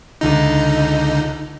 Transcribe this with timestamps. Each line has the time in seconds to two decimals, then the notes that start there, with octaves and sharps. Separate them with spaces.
0.21 C#2 D3 D#4